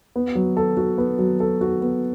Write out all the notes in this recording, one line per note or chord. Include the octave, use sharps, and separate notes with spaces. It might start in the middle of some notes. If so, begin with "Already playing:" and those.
B3
F#3
A4
F#4
B3
F#3
A4
F#4
B3